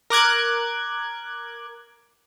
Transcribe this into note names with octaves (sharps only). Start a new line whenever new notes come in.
A#4 D6 F#6 G#6